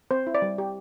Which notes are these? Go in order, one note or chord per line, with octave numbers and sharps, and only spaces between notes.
C4 C5
E4
D5
G3
G4